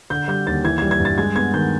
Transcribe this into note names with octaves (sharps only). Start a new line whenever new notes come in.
D3 G6
G3 G6
D#2 A6
E3 G#6
G3 G#6
G#6
G2
A6
G#3 G#6
B3 G#6
D#3 G6